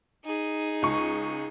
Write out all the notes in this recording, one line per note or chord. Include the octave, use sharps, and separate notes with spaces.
D#4 G#4
C#2 C#6